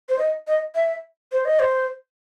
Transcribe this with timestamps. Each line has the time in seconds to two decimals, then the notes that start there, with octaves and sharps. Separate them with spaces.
0.09 C5
0.19 D#5
0.47 D#5
0.75 E5
1.32 C5
1.45 D#5
1.59 C5